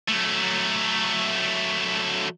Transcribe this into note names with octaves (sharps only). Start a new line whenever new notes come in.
F#3 A3